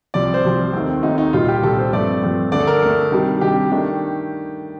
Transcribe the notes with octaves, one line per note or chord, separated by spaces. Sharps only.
C2 C3 F3 C4 D5
C5
C2 C3 F3 C4
D#2 D#3 A3 C4
D#2 D#3 A3 C4 D#4
D#4
C2 A#2 G3 F4
G4
C2 A#2 G3 A4
C5
G2 F3 A3 C4 D5
G2 F3 A3 C4
D2 D3 A3 D4 D5
A4
A#4
D2 D3 A3 D4 A4
C3 D#3 G3 D4
C3 D#3 G3 D4 G4
D#3 A3 D4